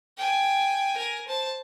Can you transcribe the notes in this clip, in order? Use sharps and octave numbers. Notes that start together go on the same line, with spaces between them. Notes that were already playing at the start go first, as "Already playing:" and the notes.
G5 G#5
A#4 G#5
C5 A5